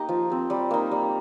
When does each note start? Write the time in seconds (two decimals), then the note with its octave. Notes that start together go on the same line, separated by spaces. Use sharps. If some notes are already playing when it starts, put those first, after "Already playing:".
Already playing: A#3 D#4 G4 D#5
0.09 F3
0.30 C4 G4
0.50 G3
0.71 A#3 D#4
0.91 G3